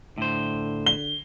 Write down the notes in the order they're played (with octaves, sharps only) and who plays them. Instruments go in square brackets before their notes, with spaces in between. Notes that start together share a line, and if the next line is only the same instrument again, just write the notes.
[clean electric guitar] A2 C5 [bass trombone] D3
[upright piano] G7